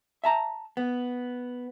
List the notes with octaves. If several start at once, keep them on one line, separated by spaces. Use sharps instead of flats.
E5 A5 A#5
B3